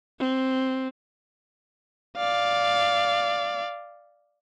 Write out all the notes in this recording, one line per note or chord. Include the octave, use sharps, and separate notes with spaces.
C4
D5 F5